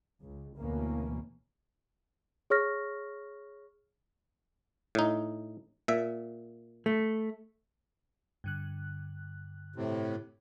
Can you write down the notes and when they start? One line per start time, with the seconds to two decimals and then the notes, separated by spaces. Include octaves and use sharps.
0.21 C#2
0.57 D2 B2 E3 A#3 C#4
2.50 G#4 C#5 C#6 F6 A#6
4.95 A2 D#4
5.88 A#2 E5
6.86 A3
8.44 G2 D3 F#6
9.76 A2 C3